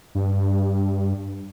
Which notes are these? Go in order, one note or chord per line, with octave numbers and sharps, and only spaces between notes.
G2